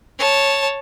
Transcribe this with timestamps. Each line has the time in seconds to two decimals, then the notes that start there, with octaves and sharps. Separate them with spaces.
0.18 C#5 A5